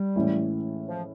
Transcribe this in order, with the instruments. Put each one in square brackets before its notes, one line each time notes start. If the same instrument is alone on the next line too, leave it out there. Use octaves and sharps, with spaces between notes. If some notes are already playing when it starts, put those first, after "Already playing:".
Already playing: [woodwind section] G3
[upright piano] A2 E3 G#3 C#4 E4
[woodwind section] F3